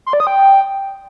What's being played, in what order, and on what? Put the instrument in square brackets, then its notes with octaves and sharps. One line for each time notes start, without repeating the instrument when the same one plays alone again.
[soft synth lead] C6
D5
D#6
G5